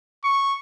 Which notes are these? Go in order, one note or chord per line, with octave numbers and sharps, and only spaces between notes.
C#6